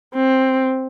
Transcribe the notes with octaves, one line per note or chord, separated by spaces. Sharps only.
C4